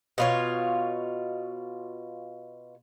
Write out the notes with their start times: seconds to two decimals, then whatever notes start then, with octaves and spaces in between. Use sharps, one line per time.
0.18 B2 F4 C#5